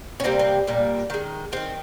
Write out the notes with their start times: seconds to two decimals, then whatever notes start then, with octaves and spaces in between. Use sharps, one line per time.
0.20 C#4
0.24 C3 G3 A#3 C4
0.39 C4
0.67 A#2 G3 A#3
1.10 D#3 G#3
1.52 D#3 G#3 C4